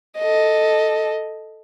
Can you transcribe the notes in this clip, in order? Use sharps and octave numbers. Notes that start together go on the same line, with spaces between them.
A4 D#5